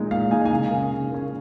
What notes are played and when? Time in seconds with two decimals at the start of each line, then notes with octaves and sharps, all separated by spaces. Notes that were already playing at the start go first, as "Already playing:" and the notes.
Already playing: A#2 G#3 D#4
0.10 A#2 F5
0.31 G#3 D#4 G#5
0.45 G#5
0.50 C#3 F5
0.71 A#3 C#4
0.91 C#3
1.11 A#3 C#4